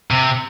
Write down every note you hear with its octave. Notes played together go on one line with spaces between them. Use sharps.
C3